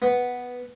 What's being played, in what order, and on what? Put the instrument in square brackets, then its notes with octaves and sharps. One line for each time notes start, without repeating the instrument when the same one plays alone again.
[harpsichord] B3